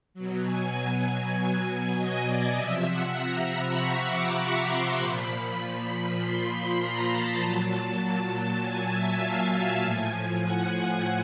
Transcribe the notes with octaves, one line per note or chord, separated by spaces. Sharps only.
B2 F#3
G#5
G#5
D#5
D5
C3 F3 E5
F#5
A#5
B5
C#6
D6
C#6
C6
A#2 F3 B5
C6
B5
A#5
A5
A#2 F#3
G#5
E5
F5
G#5
A2 F3
F#5